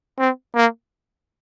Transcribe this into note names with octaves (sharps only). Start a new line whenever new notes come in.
C4
A#3